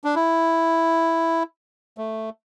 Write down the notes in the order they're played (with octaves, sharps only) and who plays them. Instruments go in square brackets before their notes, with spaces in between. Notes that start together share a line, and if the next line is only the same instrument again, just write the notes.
[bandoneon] D4
E4
A3